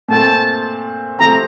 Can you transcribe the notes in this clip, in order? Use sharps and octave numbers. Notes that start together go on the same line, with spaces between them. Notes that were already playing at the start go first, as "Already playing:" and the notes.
A#2 A3 C4 A5
C3 F3 A3 C4 A#5